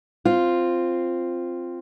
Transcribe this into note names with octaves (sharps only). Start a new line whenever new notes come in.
C4 F4